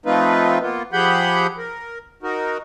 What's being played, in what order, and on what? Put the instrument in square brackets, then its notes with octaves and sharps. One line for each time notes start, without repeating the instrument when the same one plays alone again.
[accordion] F3 A3 C4 D#4 F4 B4
A#3 B3 F4
F3 G4 G#4 F#5 B5 G6
A#4
D#4 F#4 A#4